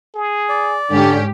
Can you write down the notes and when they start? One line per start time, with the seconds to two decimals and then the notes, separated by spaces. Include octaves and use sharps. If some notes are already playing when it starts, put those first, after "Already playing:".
0.15 G#4
0.49 D5
0.91 G#2 D3 C#4 G4